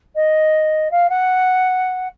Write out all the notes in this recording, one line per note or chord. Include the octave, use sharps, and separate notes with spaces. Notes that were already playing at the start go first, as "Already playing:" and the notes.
D#5
F5
F#5